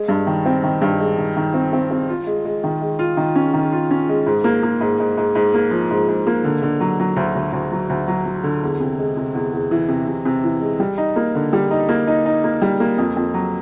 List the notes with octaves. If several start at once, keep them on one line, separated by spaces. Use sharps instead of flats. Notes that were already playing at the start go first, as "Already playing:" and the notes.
Already playing: G#3
G2
D#3
C4
D#3
G2
G#3
D#3
D#3
C4
C4
C4
F4
G#3
G#3
D#3
G#3
F4
D#3
C#4
D#3
F4
C#4
G#3
G#2
A#3
A#3
G#2
G#2
G#2
G#2
A#3
F3
G#2
G#2
A#3
D3
D3
F#3
F#3
D2
D2
D2
F#3
D2
F#3
F#3
D3
E2
C3
G#3
C3
E2
E2
E3
C3
C3
C3
E3
G#3
G3
D#4
A#3
D3
G3
D#4
A#3
D#4
D#4
A#3
G3
A#3
F2
F2
F#3